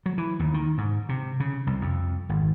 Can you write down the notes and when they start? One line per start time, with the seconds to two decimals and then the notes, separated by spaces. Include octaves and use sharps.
0.06 F#3
0.18 E3
0.39 D#2
0.54 D#3
0.78 G#2
1.09 C3
1.40 C#3
1.67 C2
1.81 F2
2.29 G#1